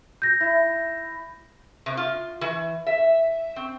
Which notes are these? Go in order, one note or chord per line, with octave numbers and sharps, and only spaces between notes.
G6 A#6
E4
C3
F4
E3
E5
C4